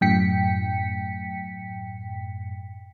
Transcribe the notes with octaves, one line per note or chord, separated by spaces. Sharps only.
F#2 A2 G5 B6 C#7